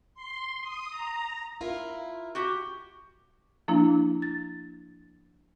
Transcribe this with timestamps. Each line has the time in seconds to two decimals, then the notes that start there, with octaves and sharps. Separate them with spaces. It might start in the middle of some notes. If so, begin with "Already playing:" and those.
0.14 C6
0.61 D#6
0.90 A#5
1.61 E4 F4 A#4
2.35 F#4 G4
3.68 F3 A#3 D4 E4
4.22 A6